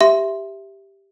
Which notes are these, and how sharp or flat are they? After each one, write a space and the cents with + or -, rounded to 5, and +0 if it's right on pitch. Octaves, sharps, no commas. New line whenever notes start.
G4 +0 E5 +0 C6 +0